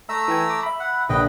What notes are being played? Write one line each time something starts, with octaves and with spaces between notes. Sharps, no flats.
A3 E5 A#5 E6
E3 G5 G#5
D6
E5 B5
F#5
A#1 B4 D#5 G5